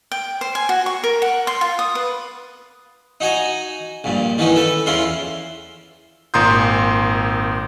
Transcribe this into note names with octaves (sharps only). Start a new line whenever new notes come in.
G5
C5
G#5
F#4
C#6
A#4
F#5
C6
F4
D#6
B4
D#4 F#4 G#5 A#5
A#1 G2 A#2
D#3 E3 B3 C#4 D#4
A4 B4
E2 C#4 E4 F4 C6
G#1 A#2 A#5 C6 D#6 G6